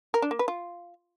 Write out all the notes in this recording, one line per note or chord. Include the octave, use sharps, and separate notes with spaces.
A#4
D4
A#3
B4
F4